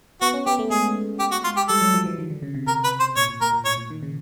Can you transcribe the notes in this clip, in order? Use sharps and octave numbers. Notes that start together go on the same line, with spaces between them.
B3 F#4
C#4
B3 G4
A3
G#3 G#4
G4
F#4
F4
G4
G3 A4
F#3
F3
E3
D#3
D3
C#3
C3
C3 A#4
B4
C5
A#2 C#5
A#2
A#2 A#4
A#2
A2 C#5
A#2
D#3
C#3